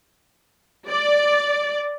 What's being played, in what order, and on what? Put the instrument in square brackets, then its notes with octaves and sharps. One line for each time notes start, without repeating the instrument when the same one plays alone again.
[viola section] D5